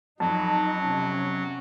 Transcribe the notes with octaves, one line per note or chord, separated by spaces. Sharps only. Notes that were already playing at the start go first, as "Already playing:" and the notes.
F2 F#3 D#4 A5
C3 C#4